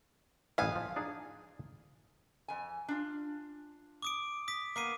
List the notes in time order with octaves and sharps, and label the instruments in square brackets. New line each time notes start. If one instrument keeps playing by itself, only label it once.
[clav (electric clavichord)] A1 B3 E5 [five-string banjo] F5 G#5
[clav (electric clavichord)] F3
D4 D#4 G#4
[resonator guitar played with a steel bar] F2 G#5
D4 F4
[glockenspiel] D6 D#6 D7
D#6 B6
[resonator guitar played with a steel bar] A#3 B3 [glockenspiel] D6 C7 D#7